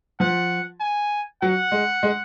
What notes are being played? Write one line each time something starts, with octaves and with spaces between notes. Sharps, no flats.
F3 F#5
G#5
F#3 F#5
G#3
G#3